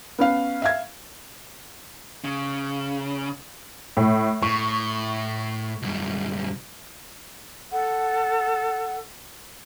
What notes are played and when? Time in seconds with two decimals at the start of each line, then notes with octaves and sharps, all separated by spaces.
0.19 B3 C#4 F5
0.62 E5 F5 G#6
2.24 C#3
3.97 A2
4.42 A2 C#6
5.82 C2 F#2
7.72 A4 F#5